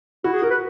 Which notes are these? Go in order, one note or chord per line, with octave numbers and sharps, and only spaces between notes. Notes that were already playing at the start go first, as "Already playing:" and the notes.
E4 F#4
G#4
F#4 A#4
B4